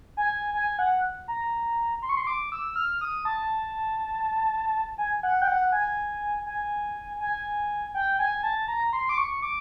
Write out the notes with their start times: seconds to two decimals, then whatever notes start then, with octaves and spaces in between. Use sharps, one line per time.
0.17 G#5
0.54 G#5
0.79 F#5
1.28 A#5
2.02 C6
2.09 C#6
2.17 C6
2.27 D6
2.52 E6
2.76 F6
3.01 D#6
3.25 A5
4.98 G#5
5.23 F#5
5.42 G5
5.48 F#5
5.72 G#5
6.46 G#5
7.20 G#5
7.94 G5
8.19 G#5
8.43 A5
8.68 A#5
8.93 C6
9.09 D6
9.18 C#6
9.42 D6